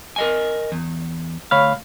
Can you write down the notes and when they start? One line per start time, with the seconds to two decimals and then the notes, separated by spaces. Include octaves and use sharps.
0.16 A#4 D#5 G#5
0.72 E2
1.51 D2 C#5 F5 B5 F6